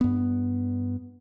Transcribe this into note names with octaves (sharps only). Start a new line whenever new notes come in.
G2 B3